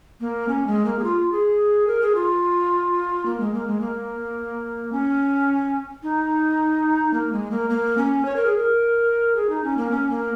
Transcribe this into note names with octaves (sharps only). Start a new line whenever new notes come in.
A#3
C#4
G#3
A#3
G#4
F4
G#4
A#4
G#4
F4
A#3
G#3
A#3
G#3
A#3
C#4
D#4
A#3
G#3
A#3
A#3
C#4
C#5
A#4
G#4
A#4
G#4
D#4
C#4
A#3
C#4
A#3